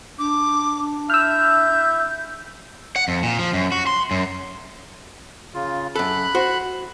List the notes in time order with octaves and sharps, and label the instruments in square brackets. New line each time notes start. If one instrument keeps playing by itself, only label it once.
[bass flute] D4 [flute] D6
[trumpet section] E4 E5 [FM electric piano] E6 F6 [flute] G6
[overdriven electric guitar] F#5
F2
A#2
F3
F#2
F#4
C6
F#2
[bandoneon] C#3 F4
[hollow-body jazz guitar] F#2 A4 [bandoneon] B5 F#6
[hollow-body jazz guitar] F#4 C5